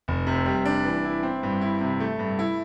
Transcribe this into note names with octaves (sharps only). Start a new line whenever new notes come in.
F1
C3
G3
D4
E3
E4
C4
G2
E4
C3
A3
G2
E4